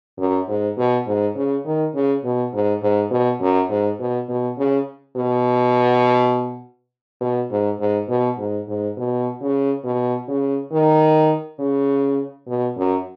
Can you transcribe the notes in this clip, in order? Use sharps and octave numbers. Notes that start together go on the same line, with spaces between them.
F#2
G#2
B2
G#2
C#3
D#3
C#3
B2
G#2
G#2
B2
F#2
G#2
B2
B2
C#3
B2
B2
G#2
G#2
B2
G#2
G#2
B2
C#3
B2
C#3
D#3
C#3
B2
F#2